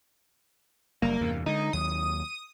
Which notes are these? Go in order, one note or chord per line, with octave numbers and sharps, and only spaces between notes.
F#1 G3 A#3
E2 G2 C3
D3 G#3 D#4
D#2 F#3 D#6